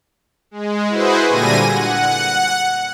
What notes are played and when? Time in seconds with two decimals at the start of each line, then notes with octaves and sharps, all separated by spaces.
0.51 G#3
0.89 E4 F#4 G#4 B4 C5
1.28 A#2 D3 G3 G#5 A#6 D#7
1.67 F#5